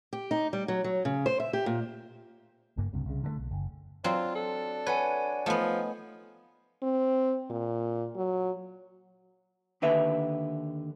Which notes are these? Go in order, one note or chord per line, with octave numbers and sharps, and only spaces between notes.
G4
D#4
G3
F#3
F#3
C#3
C5
E5
G4
A#2
F#1 G2 A#3
C#2 G2 C3
C2 C#3
D3 D#3 A3
B1
F#1
F#3 C4 D4 F4
A4
B4 C#5 F#5 G#5
F3 A3 B3 D#4
C4
A#2
F#3
D#2 D3 B4 E5